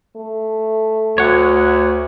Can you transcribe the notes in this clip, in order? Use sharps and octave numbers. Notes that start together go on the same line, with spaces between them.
A3
D2 C#5 F#5